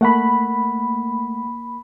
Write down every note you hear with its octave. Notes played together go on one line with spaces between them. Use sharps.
A3 A#3 F#5 B5